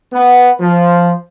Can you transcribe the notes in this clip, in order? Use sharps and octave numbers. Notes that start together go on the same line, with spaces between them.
B3
F3